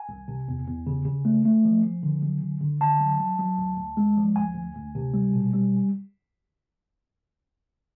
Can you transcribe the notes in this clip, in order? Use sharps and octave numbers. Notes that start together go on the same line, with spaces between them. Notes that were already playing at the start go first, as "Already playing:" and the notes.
Already playing: G#5
C2
C3
E2
E2
C#3
C#3
A3
A3
F3
F3
D3
F#3
D3
D3
D3 A5
F#3
F#3
F#3
D2
D2
G#3
F3
D2 G#5
D2
D2
C3
G3
B2
G3